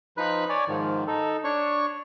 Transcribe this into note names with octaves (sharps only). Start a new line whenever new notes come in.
F3 D#4 B4 B5 F#6
C#5 D5 G#5
G#2 D#3 F3
D#4 A4
D4 C#5 C#6